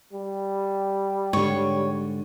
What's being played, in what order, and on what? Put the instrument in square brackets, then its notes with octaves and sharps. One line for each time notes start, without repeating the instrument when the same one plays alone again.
[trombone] G3
[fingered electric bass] G#2 D3 [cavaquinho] C#5